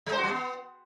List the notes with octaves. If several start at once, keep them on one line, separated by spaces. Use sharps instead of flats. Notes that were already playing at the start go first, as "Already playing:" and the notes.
G#3
C5
F#4
G3
B3